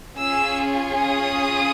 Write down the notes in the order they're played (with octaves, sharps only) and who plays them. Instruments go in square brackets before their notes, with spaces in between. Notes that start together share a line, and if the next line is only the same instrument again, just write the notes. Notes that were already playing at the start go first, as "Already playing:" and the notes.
[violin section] C#4 F4 G#4 E6
D#6